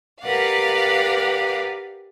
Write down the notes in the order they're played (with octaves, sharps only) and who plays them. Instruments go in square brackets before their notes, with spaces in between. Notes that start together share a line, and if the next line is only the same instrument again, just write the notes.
[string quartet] G4 A#4 B4 D5 F5 F#5